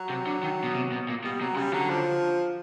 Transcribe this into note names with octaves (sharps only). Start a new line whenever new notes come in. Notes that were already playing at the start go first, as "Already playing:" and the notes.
Already playing: F#3
C3
D3
D#3
B2
C3
B2
A#2
B2 G3
C3 F#3
C#3 G3
D3 F#3
F3